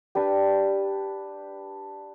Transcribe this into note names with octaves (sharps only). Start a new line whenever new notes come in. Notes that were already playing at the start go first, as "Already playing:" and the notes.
D4 G4 B4